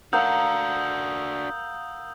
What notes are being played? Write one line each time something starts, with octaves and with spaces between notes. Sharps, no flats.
D4 F#4 A#4 F5 F#5 D#6 E6 G6